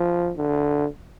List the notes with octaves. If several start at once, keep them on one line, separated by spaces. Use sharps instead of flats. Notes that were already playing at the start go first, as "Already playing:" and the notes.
Already playing: F3
D3